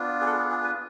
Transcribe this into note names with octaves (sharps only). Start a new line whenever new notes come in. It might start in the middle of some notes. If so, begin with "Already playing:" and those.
Already playing: B3 D4 F4
G#4
A4
G#4
G#4
B4